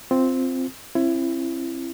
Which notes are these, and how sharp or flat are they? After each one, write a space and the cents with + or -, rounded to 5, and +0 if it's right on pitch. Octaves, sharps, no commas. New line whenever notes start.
C4 +0 F4 +0
C4 +40 E4 +25